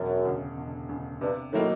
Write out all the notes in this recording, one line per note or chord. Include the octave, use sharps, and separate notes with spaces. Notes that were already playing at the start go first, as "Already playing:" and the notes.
Already playing: E1 F#2
D2 C#3
E1
D2 C#3
G2 C3
A2 D#3 F#3 A#3 D#4